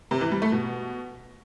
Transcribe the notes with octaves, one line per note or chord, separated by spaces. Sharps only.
C3
E3
G3
A3
B2